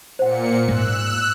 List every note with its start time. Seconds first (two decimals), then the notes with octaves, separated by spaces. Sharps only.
0.19 A#2 C5 F#5 C#7
0.68 G#2 G#3 E6 F#6